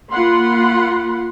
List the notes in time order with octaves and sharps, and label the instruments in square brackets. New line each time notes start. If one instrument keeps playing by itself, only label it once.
[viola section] A#3 F4 F#5 B5 C6